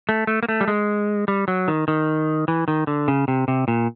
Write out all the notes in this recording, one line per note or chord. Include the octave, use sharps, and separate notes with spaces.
A3
A3
A#3
A3
G3
G#3
G3
F#3
D#3
D#3
E3
D#3
D3
C#3
C3
C3
A#2